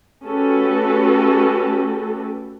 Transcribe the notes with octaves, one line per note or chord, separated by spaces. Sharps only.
A3 C#4 F#4 G4 A4 B4